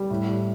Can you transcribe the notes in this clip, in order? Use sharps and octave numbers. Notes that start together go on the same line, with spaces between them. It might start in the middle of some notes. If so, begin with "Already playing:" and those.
Already playing: G3
A2
G3